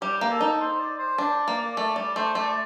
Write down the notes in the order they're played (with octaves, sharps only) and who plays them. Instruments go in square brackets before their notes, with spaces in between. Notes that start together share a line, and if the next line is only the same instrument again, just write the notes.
[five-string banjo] G3 [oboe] G4
[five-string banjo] A#3
[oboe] A4
[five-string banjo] D#4
[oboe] C5
D5
C5
[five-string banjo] D4 [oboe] D5
[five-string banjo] A#3
[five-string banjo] A3 [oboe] D5
[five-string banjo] G3 [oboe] D5
[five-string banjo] A3 [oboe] C5
[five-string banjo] A3 [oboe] D5
[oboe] D5